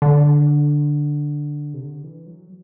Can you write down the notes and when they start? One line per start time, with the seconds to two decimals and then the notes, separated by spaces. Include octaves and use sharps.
0.02 D3
1.74 C3
1.81 D3
2.04 E3
2.26 F#3